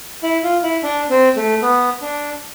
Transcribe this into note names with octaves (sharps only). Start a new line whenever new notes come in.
E4
F4
E4
D4
C4
A3
B3
D4